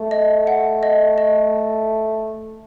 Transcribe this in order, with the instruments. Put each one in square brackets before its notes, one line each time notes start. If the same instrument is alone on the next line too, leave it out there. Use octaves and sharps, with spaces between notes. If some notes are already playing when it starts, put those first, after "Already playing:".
Already playing: [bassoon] A3
[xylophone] D#5
F#5
D#5
D#5